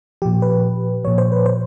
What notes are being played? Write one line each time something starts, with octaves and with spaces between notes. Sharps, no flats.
A#2 F3 G4
B4
A#2 F3 C#5
C5
B4
C5